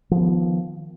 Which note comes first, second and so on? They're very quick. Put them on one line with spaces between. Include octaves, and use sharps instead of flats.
F3 B3 D#3